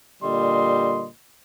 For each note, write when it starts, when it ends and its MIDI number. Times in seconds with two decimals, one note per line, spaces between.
0.23 1.07 46
0.23 1.07 50
0.23 1.07 55
0.23 1.07 75
0.23 1.07 84